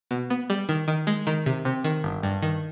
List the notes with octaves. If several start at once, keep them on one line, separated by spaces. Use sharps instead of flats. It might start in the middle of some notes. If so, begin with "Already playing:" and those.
B2
B3
G3
D#3
D#3
G#3
D#3
C3
C3
D#3
G1
G2
D#3